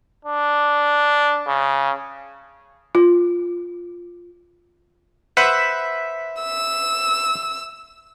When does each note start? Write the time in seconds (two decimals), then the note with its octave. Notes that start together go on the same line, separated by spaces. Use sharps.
0.25 D4
1.48 C#3
2.95 F4
5.37 B4 C5 E5 F#5
6.42 E6